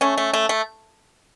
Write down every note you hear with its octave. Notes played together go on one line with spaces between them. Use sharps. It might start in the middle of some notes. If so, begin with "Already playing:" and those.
A3 C#4
A3
A3
A3